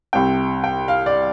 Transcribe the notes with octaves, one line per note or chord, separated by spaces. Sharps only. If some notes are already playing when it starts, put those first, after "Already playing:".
C2 C3 G5
G5
F5
D5